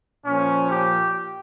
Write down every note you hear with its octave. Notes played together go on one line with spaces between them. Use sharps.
A#2 F3 C#4
G4